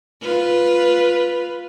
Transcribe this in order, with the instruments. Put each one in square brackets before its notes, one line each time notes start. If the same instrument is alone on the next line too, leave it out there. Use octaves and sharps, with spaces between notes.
[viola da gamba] F4 B4